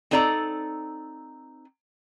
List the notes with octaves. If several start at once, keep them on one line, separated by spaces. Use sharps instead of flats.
C4 D#4 A4 D5 G#5 A#5